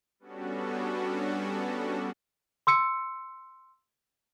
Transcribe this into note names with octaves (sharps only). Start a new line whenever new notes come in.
G3 B3 C#4 D4 F#4 A4
C6 E6 C#7